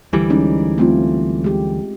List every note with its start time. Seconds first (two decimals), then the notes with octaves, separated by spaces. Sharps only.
0.13 D2 E3 G3
0.30 G#3 C#4 D#4
0.78 A3 C4 F4
1.44 G#3 G4